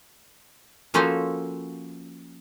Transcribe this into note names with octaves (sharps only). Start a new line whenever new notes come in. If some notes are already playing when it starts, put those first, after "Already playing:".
F3 A#3 C#4 F#4 A4 C5